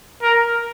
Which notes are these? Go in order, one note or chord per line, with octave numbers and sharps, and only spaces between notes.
A#4